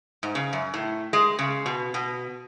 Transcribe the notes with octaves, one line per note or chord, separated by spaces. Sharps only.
G#2
C#3
F#2
A2
G#3
C#3
B2
B2